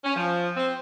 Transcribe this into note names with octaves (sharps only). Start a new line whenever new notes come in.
C#4
F3
C4